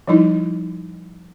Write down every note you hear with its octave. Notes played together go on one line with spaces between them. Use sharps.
F3 G3 D#4 E4